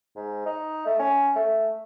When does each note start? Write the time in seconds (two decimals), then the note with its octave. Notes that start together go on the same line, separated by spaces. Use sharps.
0.16 G#2
0.46 D#4
0.86 A3
0.99 C#4
1.36 A3